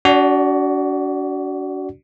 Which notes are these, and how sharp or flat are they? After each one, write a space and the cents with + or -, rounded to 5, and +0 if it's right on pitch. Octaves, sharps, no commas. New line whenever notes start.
D4 -40 F#4 +20 D5 +0